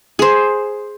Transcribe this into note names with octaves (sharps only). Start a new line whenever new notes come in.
G#4 C5